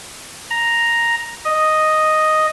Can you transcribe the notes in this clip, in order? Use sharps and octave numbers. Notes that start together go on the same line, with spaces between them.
A#5
D#5